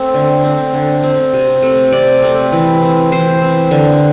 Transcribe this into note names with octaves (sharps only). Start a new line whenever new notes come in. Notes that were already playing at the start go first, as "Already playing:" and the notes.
Already playing: A3 C4 E5
D3
C4
D3
C4
C3
A3 C4
C3 D5
A3 C4
E3
C4
E3 C5
C4
D3